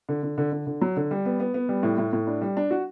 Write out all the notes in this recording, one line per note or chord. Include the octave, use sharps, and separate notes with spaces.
D3
D3
D3
D3
D3
F#3
D3
G3
B3
B3
B3
G3
A2
A2
A2
D4
G3
D4
F#4